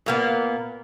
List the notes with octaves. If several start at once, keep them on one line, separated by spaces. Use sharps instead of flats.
A#2 A#3 B3